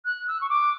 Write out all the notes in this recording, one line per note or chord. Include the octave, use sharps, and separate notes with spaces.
F#6
E6
C#6
D6